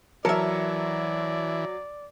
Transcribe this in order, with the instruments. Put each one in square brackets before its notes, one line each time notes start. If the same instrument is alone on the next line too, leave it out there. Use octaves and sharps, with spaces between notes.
[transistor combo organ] E3 [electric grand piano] F#3 A5 C#7 [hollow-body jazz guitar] A#4 E5 [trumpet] D5